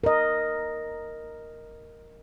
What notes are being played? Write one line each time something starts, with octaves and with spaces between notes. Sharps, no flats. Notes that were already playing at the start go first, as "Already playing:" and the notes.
A#4 D#5